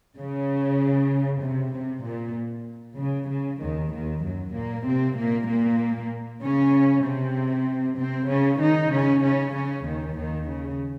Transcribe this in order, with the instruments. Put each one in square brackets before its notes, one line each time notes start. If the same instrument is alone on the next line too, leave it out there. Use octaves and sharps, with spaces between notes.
[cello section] C#3
C3
C3
A#2
C#3
C#3
D#2 D#3
D#2 D#3
F#2 F#3
A#2 A#3
C3 C4
A#2 A#3
A#2 A#3
C#3 C#4
C3 C4
C3 C4
C#3 C#4
D#3 D#4
C#3 C#4
C#3 C#4
C#3 C#4
D#2 D#3
D#2 D#3
C#3